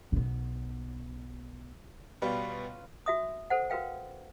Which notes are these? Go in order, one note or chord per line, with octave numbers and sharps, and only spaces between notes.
B1 B3
B2 G3 B3 C#4 F4 B4
F#4 E5 D#6
A4 C5 F#5
F#4 A#4 B4 F5 G5